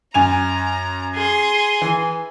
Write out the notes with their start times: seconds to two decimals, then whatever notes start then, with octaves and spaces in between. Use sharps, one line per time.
0.14 F#2 G#5 A#5 F7
1.15 G#4 C6
1.82 E3